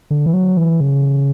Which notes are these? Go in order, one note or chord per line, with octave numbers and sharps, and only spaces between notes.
D3
E3
F#3
E3
C#3